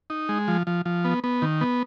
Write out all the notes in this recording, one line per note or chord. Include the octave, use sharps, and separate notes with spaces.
D#4
G#3
F3
F3
F3
B3
B3
D#3
B3